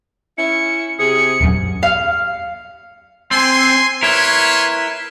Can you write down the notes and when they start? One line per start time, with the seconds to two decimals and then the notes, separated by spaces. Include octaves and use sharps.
0.38 C#4 E4 C#7
0.99 C3 G#4 C#7
1.41 D#1 F#2
1.83 F5
3.31 C4 G#5 C6
4.03 E4 A#4 B4 C#5 C6